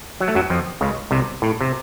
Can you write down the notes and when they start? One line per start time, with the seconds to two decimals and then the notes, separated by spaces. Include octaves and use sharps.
0.20 F#3
0.28 A3
0.35 F#2 F#3
0.50 F2 F3
0.81 C#2 C#3
1.11 C2 C3
1.42 A2
1.61 C3